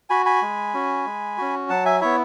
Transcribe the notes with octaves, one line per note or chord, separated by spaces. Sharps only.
F#4 G#5 B5
G#5 B5
G#3
C#4 F#4
G#3
C#4 F#4
F#3 F#5 A5
E5 G#5
B3 E4 C#5 E5